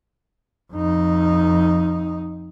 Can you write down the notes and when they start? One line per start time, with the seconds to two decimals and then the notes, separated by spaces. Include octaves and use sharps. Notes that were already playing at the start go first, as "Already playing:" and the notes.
0.73 F2 D#4